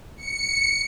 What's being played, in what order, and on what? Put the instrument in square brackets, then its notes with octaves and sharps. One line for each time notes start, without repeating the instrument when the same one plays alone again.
[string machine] C#7